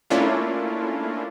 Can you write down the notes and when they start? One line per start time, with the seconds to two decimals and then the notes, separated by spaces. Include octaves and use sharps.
0.10 A3 A#3 C#4 D4 E4 F4